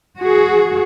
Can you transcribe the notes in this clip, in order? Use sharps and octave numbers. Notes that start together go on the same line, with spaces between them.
F#4 G#4